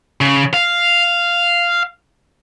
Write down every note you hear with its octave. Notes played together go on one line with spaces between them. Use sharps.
C#3
F5